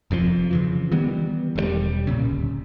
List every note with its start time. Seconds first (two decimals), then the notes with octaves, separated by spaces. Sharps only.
0.11 F1 F2 C3 F3
0.51 C#3 E3 F3
0.91 D#3 E3 G3 B3
1.56 E1 C3 G3
2.07 A#1 A#2 C#3
2.25 D1